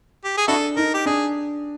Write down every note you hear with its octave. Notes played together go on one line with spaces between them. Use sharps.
G4
G#4
D4 E4 F#4 A4
D#4 A#4
G4
D4 G#4